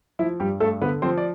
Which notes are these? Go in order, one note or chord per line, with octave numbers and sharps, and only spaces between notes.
F3 E4
G2 G3 G4
G2 A3 A4
D3 B3 B4
F3 C4 C5
D5